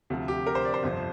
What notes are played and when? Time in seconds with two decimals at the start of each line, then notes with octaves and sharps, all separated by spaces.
0.10 D2 C3 F3
0.28 G4
0.47 A#4
0.55 C5
0.65 D5
0.74 C5
0.83 G1 F2 C3 F3